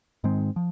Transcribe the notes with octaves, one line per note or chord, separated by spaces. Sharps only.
G#2 D#3 G#3 C4
F3